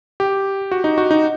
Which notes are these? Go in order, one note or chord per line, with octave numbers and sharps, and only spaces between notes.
G4
F#4
D#4
F#4
D#4